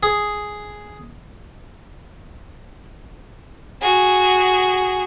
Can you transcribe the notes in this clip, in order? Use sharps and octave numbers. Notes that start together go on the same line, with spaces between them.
G#4
F#4 G#4